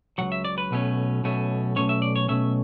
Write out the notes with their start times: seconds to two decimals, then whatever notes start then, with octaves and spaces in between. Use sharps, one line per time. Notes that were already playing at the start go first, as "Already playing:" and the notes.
0.18 C#2 B2 F#3 F#5
0.32 E5
0.45 D5
0.58 B4
0.71 B1 B2 A3 C#4
1.24 B1 B2 A3 C#4
1.76 B1 B2 A3 C#4 C#5
1.89 E5
2.02 D5
2.16 C#5
2.28 B1 B2 A3 C#4 E5